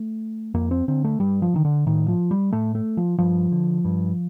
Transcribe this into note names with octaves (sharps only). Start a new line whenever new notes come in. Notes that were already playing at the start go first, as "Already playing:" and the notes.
Already playing: A3
F2 A#3
C4
D3 C4
A3
G2 G3
F3
D3 D#3
D3
A2 D#3
F3
G3
A2 A3
A3
F3
G2 F3
D3
G2